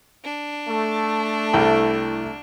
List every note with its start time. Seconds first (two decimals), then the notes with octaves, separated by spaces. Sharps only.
0.24 D4
0.69 A3
1.53 C2 E4 A4 G5